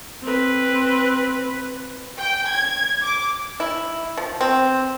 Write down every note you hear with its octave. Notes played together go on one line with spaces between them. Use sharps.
C4 B4
G5
G#6
D6
E4
F3
C4